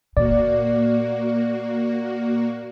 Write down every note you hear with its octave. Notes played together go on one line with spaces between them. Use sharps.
A#2 A#3 F#4 D5